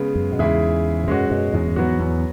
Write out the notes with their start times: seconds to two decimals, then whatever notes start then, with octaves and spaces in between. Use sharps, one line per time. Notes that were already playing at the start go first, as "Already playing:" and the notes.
Already playing: C#3 G#3 B3
0.15 F#2
0.32 B2
0.39 E2 G#2 C#3 G#3 E4 G#4
1.04 C#3
1.07 F#2 B2 G#3 C#4 F#4
1.31 F#2 B2
1.53 E2 G#2
1.66 F#2
1.76 E2 G#2 F#3 B3 F#4
1.99 E2